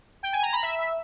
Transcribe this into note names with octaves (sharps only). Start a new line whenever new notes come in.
G5
G#5
A#5
B5
E5